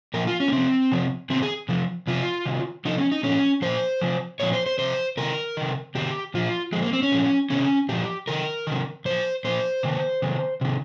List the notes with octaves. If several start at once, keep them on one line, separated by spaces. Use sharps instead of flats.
A#2 F3 A#4
F4
C#4
A#3
C3 F3 C4
C3 F3
C3 D#3 C4
G#4
C3 F3
C3 F3 F4
C3 D#3
C3 F3 D#4
C#4
D#4
A#2 F3 C#4
A#2 F3 C5
C3 F3
A#2 F3 C#5
C5
C5
C3 F3 C5
C3 D#3 A#4
C3 D#3
C3 D#3 G4
A#2 F3 F4
A#2 F3 G#3
A#3
C4
C#4
A#2 F3
C3 D#3 C#4
A#2 F3 G4
C3 D#3 A#4
C3 D#3
A#2 F3 C5
A#2 F3 C5
C3 D#3
C3 D#3
C3 D#3